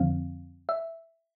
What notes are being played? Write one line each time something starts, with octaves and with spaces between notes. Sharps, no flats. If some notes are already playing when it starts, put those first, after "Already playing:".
Already playing: F2 D3 F3 C4 F5
E5